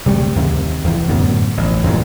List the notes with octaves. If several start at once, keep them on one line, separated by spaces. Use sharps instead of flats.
C3 G3 A3
D#2 C3
E2
F#2 A2 D3 B3
A1
E2 G2 A#2